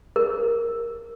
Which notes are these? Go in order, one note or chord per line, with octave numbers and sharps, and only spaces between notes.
A#4